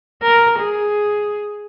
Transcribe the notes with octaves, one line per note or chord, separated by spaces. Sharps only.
A#4
G#4